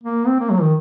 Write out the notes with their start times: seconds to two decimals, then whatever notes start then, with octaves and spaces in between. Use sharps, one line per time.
0.04 A#3
0.27 C4
0.40 A#3
0.50 F#3
0.62 D#3